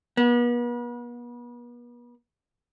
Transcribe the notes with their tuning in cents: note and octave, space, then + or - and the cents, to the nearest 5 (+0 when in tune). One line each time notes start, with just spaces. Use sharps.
B3 -40